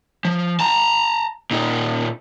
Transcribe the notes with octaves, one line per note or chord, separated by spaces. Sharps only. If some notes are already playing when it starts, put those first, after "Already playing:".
F3
A5 A#5
A#2 D#4